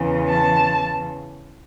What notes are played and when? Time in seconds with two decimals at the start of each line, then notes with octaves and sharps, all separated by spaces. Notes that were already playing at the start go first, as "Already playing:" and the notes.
Already playing: E2 C#3 E3
0.28 A5